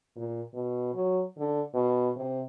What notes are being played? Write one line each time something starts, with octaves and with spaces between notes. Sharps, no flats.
A#2
B2
F#3
D3
B2
C3